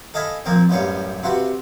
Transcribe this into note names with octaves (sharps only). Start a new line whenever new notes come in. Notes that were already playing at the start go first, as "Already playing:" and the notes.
A4 D#5 F5 G#5 B5
A#2 F3 A#3 C4
A1 F#2 G3 C#5 F5
C3 F4 F#4 B4